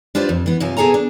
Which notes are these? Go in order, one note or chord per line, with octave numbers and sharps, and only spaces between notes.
D4 F4 G4 B4 C5 D5
F2
E3 B3
F#2 C3 F4 G#5
B2 G#4 A4 G#5 A#5
D4